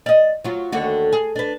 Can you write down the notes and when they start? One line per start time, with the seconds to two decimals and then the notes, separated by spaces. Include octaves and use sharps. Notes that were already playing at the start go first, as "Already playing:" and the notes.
0.06 D5 D#5
0.44 F#3 F4
0.72 D#2 D3 F#4
1.12 G#4
1.36 D4 B4